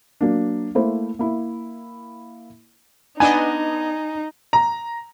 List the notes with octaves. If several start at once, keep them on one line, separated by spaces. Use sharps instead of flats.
F#3 A#3 D4
A3 A#3 E4 C5
A#3 E4
B3 D4 D#4 D#5 G#5
A#5